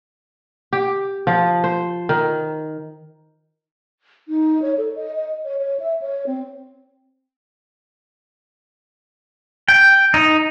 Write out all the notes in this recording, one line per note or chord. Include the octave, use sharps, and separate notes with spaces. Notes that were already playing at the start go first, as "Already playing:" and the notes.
G4
F3
C5
D#3
D#4
C#5
A4
D#5
D#5
C#5
C#5
E5
C#5
C4
G5
D#4